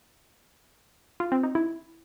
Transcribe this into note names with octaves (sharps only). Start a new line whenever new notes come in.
F4
C4
D#4
E4